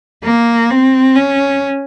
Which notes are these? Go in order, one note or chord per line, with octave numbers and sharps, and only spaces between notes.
A#3
C4
C#4